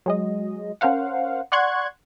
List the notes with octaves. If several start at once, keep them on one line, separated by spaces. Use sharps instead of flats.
F#3 G#3 D#5
C#4 A#4 C5 F5 F#5
D5 F#5 C6 C#6 F#6 G#6